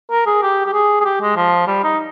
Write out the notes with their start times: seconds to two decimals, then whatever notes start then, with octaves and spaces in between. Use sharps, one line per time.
0.11 A#4
0.26 G#4
0.42 G4
0.66 G4
0.73 G#4
1.00 G#4
1.05 G4
1.21 G#3
1.36 F3
1.67 G3
1.84 D#4